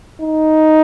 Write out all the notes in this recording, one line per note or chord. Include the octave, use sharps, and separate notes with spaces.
D#4